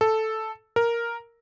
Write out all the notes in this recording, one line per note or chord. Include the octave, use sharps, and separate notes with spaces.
A4
A#4